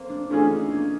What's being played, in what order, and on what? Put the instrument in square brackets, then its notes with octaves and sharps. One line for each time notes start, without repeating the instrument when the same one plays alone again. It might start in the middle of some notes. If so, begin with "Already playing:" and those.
Already playing: [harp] A#3 C4
D4
[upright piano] E3 A3 C#4 F4 G#4 [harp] D4
[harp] D#4
A#3